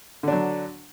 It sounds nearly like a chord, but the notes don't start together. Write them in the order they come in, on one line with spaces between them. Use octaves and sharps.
D3 D4 F#3